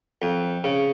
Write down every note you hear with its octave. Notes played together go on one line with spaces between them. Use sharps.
F2
C#3